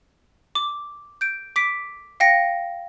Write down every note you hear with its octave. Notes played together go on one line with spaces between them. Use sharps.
D6
G6 D7
D6 B6 D7
F5 G5 A#6 C#7